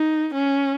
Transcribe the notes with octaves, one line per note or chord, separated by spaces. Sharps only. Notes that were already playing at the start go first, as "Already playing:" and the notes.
Already playing: D#4
C#4